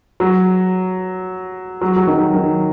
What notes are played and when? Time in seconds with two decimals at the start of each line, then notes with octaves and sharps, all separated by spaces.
0.20 F#3
1.81 F#3
1.96 F#3
2.07 D#3
2.35 D#3